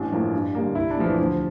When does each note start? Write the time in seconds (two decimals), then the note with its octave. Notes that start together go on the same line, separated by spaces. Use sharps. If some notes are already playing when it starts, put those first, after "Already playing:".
Already playing: A1 D4
0.12 A2 F3 A#3
0.33 G2
0.55 D3 G3 A#3
0.75 C2 E4
0.91 D4
0.96 A#2 F3 A3 E4
1.04 E3
1.18 D2 F3